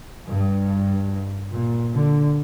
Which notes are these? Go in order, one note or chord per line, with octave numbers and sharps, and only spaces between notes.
G2
A#2
D3